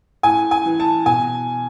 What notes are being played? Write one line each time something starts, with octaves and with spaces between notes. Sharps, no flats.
A2 G#5
G#5
E3
A5
B2 G#5